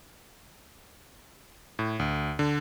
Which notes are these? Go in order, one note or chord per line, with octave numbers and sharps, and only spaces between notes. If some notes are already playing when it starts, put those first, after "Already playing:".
A2
D2
D3